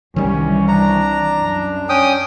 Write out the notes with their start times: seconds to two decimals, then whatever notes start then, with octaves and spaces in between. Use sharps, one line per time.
0.16 C2 D#3 E3 G3 C#4
0.68 D4 A#5
1.39 F#2
1.89 C#4 G5 D#6